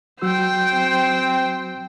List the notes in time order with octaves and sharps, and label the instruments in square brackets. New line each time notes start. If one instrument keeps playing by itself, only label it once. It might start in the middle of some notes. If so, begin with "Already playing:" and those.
[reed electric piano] F#3 F#4 E6 [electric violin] C5 G5
[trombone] C4